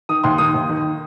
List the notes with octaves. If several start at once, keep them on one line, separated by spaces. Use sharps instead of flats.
D#3 D#6
D#2 C6
D#3 D#6
D#2
D#3